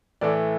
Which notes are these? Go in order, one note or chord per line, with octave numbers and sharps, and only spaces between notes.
A2 E3 A3 D5